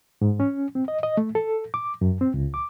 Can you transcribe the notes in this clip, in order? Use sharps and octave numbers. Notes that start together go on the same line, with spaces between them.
G#2
C#4
C4
D#5
D#5
A3
A4
D6
F#2
C4
C#2
D6